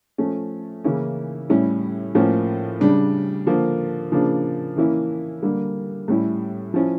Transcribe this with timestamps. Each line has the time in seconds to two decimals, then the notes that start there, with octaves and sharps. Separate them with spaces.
0.18 F3 A3 C#4
0.84 C#3 E3 A#3 C#4 E4
1.49 A2 G3 C#4 E4
2.15 A2 F3 A#3 C#4
2.80 C#3 G3 D4
3.46 D3 F3 A#3
4.12 C#3 F3 A#3 D4
4.77 E3 A#3 C#4 E4
5.42 D3 G3 A#3
6.08 A2 G3 C#4 E4
6.74 F3 C#4 E4